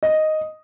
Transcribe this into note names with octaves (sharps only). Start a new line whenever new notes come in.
D#5